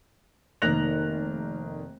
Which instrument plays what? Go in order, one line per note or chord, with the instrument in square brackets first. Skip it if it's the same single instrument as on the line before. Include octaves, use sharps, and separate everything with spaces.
[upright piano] F1 D#3 A#3 F#6 A#6 F7